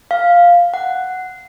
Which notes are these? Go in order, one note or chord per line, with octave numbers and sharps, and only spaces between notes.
F5
F#5